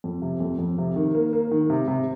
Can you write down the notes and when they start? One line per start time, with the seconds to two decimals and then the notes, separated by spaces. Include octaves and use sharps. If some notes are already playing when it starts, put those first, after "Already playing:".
0.04 F2
0.22 C3
0.40 F2
0.59 F2
0.78 C3
0.96 D#3
1.14 A#3
1.33 A#3
1.51 D#3
1.70 C3
1.88 C3